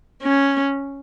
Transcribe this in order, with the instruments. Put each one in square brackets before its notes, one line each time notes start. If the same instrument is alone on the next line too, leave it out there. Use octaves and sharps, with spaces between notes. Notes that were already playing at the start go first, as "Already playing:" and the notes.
[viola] C#4